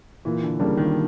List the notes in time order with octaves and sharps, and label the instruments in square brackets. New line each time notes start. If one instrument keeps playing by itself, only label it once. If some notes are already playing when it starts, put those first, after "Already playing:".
[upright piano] A#2 [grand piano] E3
[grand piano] D3
[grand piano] C#3 [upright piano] G3 A#3 D4
[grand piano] D#3